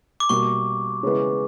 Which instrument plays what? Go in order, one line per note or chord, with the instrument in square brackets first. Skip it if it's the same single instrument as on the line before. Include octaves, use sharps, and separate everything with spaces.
[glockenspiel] D6
[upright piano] B2 G3 A#3 [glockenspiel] C#6
[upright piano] C#3 E3 G#3 B3